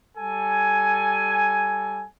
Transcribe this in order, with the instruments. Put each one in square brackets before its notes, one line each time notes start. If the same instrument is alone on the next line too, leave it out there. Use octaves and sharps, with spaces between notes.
[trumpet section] G3 A4 G#5